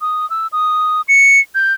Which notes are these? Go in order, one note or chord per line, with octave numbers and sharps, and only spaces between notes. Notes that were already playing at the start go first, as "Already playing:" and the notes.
D#6
E6
D#6
C#7
G6